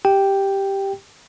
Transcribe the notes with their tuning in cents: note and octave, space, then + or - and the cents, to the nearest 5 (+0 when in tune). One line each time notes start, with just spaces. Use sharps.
G4 +0 G5 +0